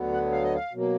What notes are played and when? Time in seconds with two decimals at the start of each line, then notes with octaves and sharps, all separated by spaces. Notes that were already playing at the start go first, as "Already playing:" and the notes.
Already playing: D2 D3 F#3 B3
0.13 F#5
0.32 F5
0.43 D#5
0.55 F5
0.73 B2 F#3 A#3